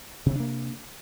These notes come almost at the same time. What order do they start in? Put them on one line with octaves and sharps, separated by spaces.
C3 C4 D4 A#3